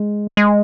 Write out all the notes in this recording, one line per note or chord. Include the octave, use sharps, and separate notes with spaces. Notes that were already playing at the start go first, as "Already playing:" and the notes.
Already playing: G#3
G#3